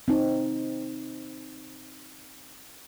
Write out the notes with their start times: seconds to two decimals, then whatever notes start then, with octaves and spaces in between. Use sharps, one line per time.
0.08 C4 D#4